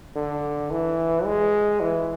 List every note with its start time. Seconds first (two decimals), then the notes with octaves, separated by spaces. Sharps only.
0.16 D3
0.71 E3
1.25 G#3
1.80 E3